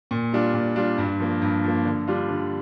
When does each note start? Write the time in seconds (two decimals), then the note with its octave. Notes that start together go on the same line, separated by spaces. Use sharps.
0.11 A#2
0.33 G3 D4 F4
0.54 A#2
0.76 G3 D4 F4
0.98 G2
1.20 F3 A#3
1.42 G2
1.64 F3 A#3
1.85 D3
2.07 G3 D4 F4
2.29 D3